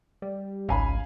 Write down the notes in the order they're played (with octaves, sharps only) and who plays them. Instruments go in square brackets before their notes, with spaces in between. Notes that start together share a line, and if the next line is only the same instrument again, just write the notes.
[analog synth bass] G3
[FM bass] G#1 [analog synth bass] C#2 [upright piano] F5 G#5 B5